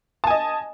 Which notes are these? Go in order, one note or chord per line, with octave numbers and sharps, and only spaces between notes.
D#5 G#5 A5